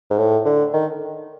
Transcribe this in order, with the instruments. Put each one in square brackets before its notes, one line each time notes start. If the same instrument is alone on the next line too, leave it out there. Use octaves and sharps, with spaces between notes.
[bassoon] G#2
A2
D3
D#3